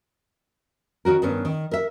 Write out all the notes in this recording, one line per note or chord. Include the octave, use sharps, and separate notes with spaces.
D#3 C#4 F#4 A#4
G2 D#3 B3 C#4
D#3
A#4 E5